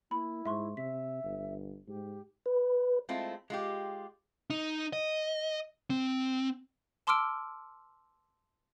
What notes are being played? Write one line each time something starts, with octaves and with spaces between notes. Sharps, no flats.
A#3 E4 B5
G#2 E5 C6 C#6
C3 E5 B6
G1
G#2 G4
B4
G#3 A3 C4 E4 F4
G#3 F4 G4
D#4
D#5
C4
A5 C6 D6 E6 F6 D7